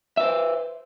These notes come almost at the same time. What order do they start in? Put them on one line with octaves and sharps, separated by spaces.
E5 B4 C5